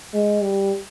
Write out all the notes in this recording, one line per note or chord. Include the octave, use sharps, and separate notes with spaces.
G#3
G3